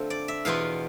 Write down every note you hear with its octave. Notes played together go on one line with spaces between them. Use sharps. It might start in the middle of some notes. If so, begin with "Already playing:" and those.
Already playing: D3 A3 C4 F4
D5
E5
E2 B2 B3 F4 F5